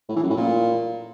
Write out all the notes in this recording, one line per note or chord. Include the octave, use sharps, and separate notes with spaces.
A2
E3
F#2
A2
A#2